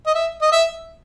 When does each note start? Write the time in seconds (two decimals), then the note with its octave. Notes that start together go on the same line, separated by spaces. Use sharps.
0.06 D#5
0.15 E5
0.42 D#5
0.52 E5